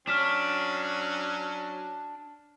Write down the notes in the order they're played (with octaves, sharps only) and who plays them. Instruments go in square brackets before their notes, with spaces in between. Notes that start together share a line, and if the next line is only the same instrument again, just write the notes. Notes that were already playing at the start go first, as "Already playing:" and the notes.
[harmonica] F#3 C#4 [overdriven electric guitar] D4 [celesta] F6 B6 E7